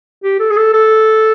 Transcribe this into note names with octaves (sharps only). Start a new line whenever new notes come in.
G4
A4
G#4
A4
A4